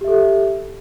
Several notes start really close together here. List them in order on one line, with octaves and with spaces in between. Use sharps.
G4 E5 A4